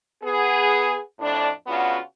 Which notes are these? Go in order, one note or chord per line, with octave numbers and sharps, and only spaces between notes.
B3 G#4
F2 A2 D4
C#3 B3 D4 F4 F#4